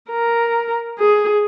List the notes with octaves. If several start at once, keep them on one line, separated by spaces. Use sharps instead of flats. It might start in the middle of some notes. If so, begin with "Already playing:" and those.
A#4
G#4